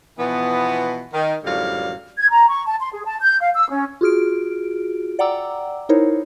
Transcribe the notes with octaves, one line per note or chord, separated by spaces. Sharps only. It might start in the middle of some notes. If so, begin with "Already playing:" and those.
B2 E3 F3 B3
D#3
F#2 A2 D3 F3 G3 F5
G#6
A#5
C#6
A5
C6
G#4
A5
G6
F5
E6
C#4
F4 F#4 G#4 F6 D7
D5 F#5 G5 A#5 D6 E6
D#4 E4 A#4 C5 C#5